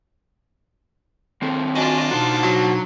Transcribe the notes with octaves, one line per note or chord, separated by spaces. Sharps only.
D#3 C4 A4
D4 F4 F#4 D#5 G#5
B2 D#4 F#4 C5 A5
F#3